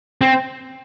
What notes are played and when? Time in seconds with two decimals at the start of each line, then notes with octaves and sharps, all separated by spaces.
0.21 C4